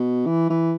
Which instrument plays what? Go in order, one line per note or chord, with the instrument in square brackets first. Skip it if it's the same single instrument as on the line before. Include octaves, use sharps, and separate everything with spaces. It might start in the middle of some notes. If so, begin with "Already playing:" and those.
Already playing: [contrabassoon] B2
E3
E3